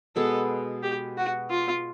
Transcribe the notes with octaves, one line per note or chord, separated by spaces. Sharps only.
B2 G#3 B3 A4
G4
F#4
F4